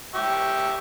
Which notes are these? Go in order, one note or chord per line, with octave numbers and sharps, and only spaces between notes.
G4 E5 C#6